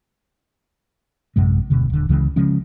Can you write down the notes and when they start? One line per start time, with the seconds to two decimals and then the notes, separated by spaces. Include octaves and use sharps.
1.36 A1 F#2 C3 G#3
1.70 D#1 B2 D3
1.90 D#1 D3
2.09 C#2 C#3 E3 G#3
2.36 C#3 F3 G#3 C#4